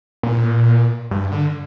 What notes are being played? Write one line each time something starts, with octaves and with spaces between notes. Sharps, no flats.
A#2
G2
D3